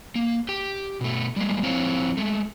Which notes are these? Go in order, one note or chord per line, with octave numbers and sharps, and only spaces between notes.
A#3
G4 G5
B2 A3
G3 G#3 A#3
F3 C4 E4 C5 C#5 F5
G#3 A3